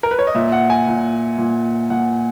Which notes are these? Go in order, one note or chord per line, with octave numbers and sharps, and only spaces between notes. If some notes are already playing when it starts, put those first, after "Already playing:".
A#4
B4
C#5
D#5
A#2 E5
F#5
G#5
A#2
A#2
A#2 F#5